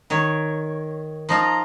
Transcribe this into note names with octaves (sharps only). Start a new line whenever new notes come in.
D#3 C#5
F3 D#4 F4 A#5